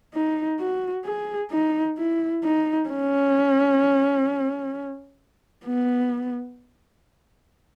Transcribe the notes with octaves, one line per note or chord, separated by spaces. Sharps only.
D#4
F#4
G#4
D#4
E4
D#4
C#4
B3